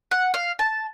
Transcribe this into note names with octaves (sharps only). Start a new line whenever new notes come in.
F#5
F5
A5